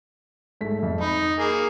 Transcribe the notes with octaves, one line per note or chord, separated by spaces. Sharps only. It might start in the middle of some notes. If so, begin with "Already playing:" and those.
G#2 A3 B6
F2 E5
D#4 B5
A#3 G#4